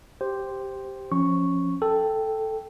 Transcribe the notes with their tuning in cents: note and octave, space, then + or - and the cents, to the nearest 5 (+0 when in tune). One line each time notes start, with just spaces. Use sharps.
G4 +0 C5 +0
F3 +10 C#4 -10 C#6 +0
A4 +0 G5 +0